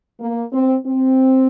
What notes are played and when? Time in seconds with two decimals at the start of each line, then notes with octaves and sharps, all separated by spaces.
0.20 A#3
0.53 C4
0.86 C4